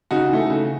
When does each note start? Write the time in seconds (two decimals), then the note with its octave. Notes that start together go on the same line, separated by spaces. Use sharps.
0.11 C#3 D#4 F#4
0.31 E3 A3
0.50 C#3